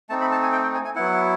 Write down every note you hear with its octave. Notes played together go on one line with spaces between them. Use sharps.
A3 C4 D#4 A5
B5
A5
G#5
G5
G5
G#5
G#5
F#3 B3 E4 F#5